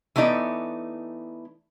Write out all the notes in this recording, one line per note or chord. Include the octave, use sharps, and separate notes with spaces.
E3 A3 B3 D#4 D5